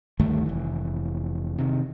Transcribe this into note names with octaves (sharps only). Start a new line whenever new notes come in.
D2 G2 D#3 A3
F1 E3
C3 D#3